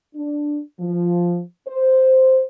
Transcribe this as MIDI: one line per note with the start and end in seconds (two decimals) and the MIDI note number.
0.15 0.60 62
0.80 1.41 53
1.68 2.43 72